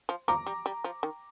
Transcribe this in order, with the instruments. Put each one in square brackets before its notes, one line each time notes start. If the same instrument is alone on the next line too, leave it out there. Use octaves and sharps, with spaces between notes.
[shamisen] F3
[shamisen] F3 [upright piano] A#5 D6
[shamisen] G3
G3
F3
D#3